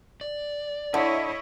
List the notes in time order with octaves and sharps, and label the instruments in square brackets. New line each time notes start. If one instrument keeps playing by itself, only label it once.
[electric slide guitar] D5
[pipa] D3 [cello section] E4 C#5 D#5